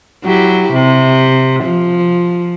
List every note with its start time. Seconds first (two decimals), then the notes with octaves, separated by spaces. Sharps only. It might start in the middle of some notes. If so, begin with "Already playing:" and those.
0.24 F#3 E4 G4
0.73 C3
1.64 F3